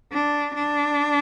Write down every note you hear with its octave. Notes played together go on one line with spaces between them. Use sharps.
D4
D4